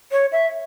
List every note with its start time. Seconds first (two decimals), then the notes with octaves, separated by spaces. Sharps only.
0.12 C#5
0.32 E5